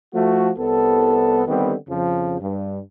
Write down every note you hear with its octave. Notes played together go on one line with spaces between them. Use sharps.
F3 A3 F#4
C2 B3 A4
D3 D#3 G3 B3 C4 G4
F2 C#3 F3
G2